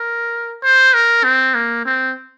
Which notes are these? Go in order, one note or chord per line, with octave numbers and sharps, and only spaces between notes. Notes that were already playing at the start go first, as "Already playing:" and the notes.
Already playing: A#4
C5
A#4
C4
A#3
C4